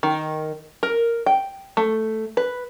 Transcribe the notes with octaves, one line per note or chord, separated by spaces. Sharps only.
D#3
A#4
G5
A3
B4